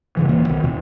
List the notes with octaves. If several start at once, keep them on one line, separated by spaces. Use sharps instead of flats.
G2 C#3 E3
D#1 E3 A#3
B1 D#3
E2 B2